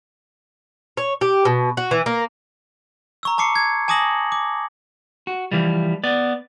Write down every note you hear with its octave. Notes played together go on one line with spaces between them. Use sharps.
C#5
G4
B2
F#4
E3
A#3
A#5 C#6 E6
A5 C#6 D6 C7 C#7
G#6
G#5 A5 D6 D#6 A#6 F#7
D6
F#4
E3 F3 G3
B3 D5